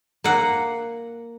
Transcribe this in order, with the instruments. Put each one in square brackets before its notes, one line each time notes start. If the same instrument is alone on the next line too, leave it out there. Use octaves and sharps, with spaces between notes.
[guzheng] A#3 F#5